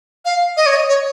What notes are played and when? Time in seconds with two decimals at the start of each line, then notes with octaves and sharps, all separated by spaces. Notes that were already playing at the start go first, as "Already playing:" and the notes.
0.25 F5
0.57 D#5
0.66 C#5
0.76 D#5
0.89 C#5